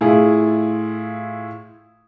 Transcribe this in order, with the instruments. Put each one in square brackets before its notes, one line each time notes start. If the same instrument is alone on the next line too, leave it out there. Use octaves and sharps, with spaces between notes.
[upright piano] A2 E4 F4 G#4